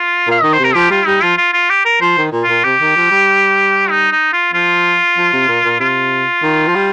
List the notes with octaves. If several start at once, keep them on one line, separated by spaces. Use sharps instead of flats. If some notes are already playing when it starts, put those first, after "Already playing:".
Already playing: F4
A#2 F5
D#3 D#5
C5
C3 A#4
F3 G4
G3 F4
G3 D#4
F3 F4
F4
F4
G4
A#4
F3 C5
D#3
A#2
F4
A#2
C3 G4
D#3
F3
G3
D#4
D#4
F4
F3 F4
F3
C3
A#2
A#2
C3 F4
D#3
F3
G3